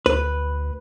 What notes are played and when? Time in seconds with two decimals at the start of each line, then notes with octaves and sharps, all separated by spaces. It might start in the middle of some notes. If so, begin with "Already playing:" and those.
0.06 D2 B4